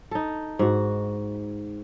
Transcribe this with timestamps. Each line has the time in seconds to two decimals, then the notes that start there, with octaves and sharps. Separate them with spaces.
0.11 D#4 A4
0.59 G#2 F#4